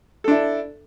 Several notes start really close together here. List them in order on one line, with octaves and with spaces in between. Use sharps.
A4 D4 E4